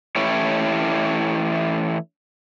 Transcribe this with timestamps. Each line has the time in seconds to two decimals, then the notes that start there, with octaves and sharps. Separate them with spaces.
0.16 E3 A3 C#4 E4 G4 C#5